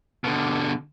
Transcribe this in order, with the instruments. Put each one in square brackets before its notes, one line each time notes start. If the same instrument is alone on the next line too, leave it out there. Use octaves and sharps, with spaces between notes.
[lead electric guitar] B2 D3